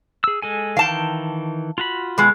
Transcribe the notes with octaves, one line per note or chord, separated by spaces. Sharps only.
G#4 E6
G#3 A4 G#5
D#3 E3 F5 G5 A5
F4 F#4 B5
B2 G#3